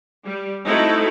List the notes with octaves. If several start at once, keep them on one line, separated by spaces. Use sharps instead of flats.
G3
A3 C4 D#4 E4 F#4 A4